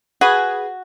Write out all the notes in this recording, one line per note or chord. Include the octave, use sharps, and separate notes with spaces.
F#4 G#4 B4 G#5